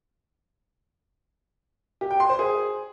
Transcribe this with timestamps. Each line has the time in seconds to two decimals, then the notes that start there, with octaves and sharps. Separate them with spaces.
2.01 G4
2.11 G5
2.20 C6
2.29 C5
2.39 G#4